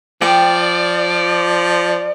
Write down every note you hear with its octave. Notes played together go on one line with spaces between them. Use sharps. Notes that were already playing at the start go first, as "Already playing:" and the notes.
F3 D5 G5